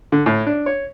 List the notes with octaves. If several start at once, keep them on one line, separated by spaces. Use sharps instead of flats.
D3
A2
D4
C#5